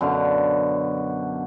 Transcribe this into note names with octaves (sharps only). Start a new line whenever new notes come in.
F#2 B2 D3 F5